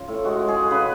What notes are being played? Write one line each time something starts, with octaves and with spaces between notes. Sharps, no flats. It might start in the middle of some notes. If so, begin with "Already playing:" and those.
Already playing: C#3 F4
A2
G#3 F#4
G#3
G#4
G#3
C#3 B4